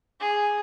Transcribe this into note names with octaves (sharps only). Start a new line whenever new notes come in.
G#4